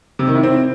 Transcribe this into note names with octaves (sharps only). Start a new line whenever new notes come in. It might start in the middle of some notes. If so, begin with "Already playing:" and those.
C3
D#3
E4
C4